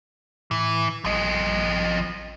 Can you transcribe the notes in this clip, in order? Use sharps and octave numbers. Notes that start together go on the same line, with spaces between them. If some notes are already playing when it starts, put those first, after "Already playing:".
A2 E3
A1 F3 D#5